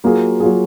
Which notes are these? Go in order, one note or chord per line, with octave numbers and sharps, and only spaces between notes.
F#3 A#3 F4 G#4
F#3 A#3 F4 G#4